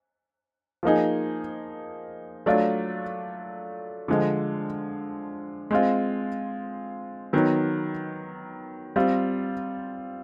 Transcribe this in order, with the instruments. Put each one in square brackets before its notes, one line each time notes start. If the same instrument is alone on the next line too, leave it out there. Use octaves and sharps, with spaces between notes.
[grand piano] F3 A#3 D#4 G#4
F#3 A3 D4 F4
D3 F3 G#3
G#3 C4 F4
D#3 F#3 B3
G3 C4 F4